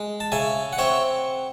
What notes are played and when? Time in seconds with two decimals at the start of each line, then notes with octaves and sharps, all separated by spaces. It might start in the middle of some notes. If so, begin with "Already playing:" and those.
Already playing: G#3
0.20 A5
0.32 C#3 E5 G#5
0.73 F#5
0.78 C4 C#5 E5